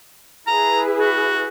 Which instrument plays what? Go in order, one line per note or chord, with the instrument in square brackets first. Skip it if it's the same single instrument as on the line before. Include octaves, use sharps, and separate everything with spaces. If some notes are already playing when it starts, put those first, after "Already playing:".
[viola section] E4 G#4 B4 [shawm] A#5
[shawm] F#4